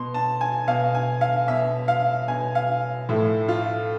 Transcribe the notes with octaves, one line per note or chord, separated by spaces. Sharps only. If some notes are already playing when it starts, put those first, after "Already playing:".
Already playing: B2 C6
A5
G#5
B2 F5
G#5
F5
B2 E5
F5
B2 G#5
F5
A2 F3 E4
F4